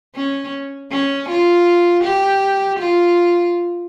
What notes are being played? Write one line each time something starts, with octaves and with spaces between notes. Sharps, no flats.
C#4
C#4
F4
G4
F4